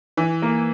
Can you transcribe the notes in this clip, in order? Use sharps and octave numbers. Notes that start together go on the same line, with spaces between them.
E3
A#3